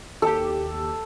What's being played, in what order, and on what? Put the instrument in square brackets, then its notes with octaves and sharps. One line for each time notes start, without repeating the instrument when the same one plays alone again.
[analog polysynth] D#2 G4 [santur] A4